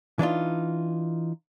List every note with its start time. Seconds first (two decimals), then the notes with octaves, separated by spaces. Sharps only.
0.19 E3 D4 D#4 F4